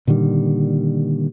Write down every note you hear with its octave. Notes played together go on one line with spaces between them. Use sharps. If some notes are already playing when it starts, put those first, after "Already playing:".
A#2 D3 D#3 G3